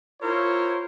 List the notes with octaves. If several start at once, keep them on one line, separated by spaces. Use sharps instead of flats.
E4 F4 A#4 C5 C#5